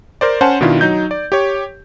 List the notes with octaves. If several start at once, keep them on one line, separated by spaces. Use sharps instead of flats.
A#4 C5 D5
C#4 C5 F#5 G#5 A5
B2 D#3 D4 E4 F4
F#3 D#4 G6
D5
G4 C#5